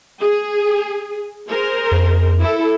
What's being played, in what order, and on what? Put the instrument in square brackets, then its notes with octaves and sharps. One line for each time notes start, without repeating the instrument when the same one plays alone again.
[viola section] G#4
G#4 A#4 C5
[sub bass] F2
[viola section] E4 A4